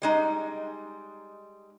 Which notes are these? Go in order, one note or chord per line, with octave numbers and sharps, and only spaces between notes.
G3 G#3 D#4